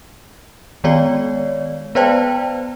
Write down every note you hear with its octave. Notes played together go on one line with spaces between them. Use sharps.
D#3 G#3 B3 C#5 D5
B3 B4 C5 D5 G5 A5